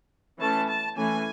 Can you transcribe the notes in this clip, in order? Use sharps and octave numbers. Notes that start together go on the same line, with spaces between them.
E3 A3 C#4 A5
A5
E3 A3 C#4 G#5